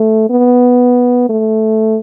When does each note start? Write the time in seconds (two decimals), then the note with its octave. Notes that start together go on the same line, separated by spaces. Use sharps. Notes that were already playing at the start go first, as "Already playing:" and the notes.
Already playing: A3
0.30 B3
1.29 A3